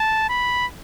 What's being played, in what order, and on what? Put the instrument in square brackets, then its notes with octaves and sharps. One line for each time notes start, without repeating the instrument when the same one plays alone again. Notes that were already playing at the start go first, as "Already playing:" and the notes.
Already playing: [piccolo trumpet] A5
B5